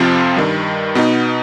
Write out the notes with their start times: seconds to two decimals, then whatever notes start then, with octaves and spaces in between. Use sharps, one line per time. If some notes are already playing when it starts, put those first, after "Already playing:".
Already playing: F2 C3 F3 C4 F4
0.36 G2 D#3 G3
0.95 B2 B3 D#4